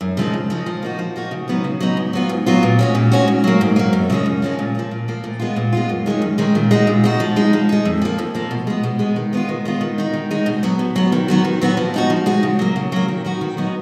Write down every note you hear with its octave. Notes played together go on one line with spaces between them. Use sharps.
F#2
C#3 F3 G#3 D#4
F#2
C#3 F3 G#3 D#4
F3
A#3 D#4 F#4
F3
A#3 D#4 F#4
C#3
F#3 B3 D#4
C#3
F#3 B3 D#4
G#2
F#3 B3 F4
G#2
F#3 B3 F4
A#2
G#3 C#4 F#4
A#2
G#3 C#4 F#4
G#2
F#3 A#3
G#2
F#3 A#3
F#2
C#3 F3 G#3 C#4
F#2
C#3 F3 G#3 C#4
A#2
F3 A#3
A#2
F3 A#3
A#2
G#3 B3 F4
A#2
G#3 B3 F4
F#2
D#3 G#3 C#4
F#2
D#3 G#3 C#4
A#2
G#3 D#4 F#4
A#2
G#3 D#4 F#4
F3
G#3 D#4
F3
G#3 D#4
F2
F3 A#3
F2
F3 A#3
B2
G#3 B3
B2
G#3 B3
D#3
G#3 B3 F4
D#3
G#3 B3 F4
D#3
G#3 D#4 F#4
D#3
G#3 D#4 F#4
B2
F#3 B3
B2
F#3 B3
D#3
F#3 B3 F#4
D#3
F#3 B3 F#4
F3
G#3 D#4 F#4
F3
G#3 D#4 F#4
C#3
F#3 A#3
C#3
F#3 A#3
D#3
F#3 B3 D#4 F#4
D#3
F#3 B3 D#4 F#4